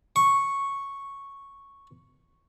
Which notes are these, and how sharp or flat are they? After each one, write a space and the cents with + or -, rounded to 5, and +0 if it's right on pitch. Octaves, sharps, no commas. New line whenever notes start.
C#6 -5